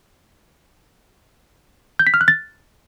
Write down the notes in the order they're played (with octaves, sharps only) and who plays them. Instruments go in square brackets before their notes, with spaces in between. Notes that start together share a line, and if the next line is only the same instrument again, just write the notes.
[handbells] G6
B6
F6
F#6
A6